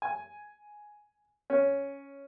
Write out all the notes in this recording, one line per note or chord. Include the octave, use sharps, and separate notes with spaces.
G#5
C#4